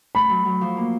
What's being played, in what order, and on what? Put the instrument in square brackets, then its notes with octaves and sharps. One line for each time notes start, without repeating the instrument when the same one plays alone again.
[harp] A3 [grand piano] B5
[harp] F#3
F#3
F3
A#3